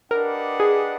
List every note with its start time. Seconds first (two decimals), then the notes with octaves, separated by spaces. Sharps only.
0.11 D4 G4 A#4 B4 D#5 F#5
0.60 G#4